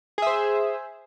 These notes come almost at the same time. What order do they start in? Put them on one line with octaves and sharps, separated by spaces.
G#4 E5 C5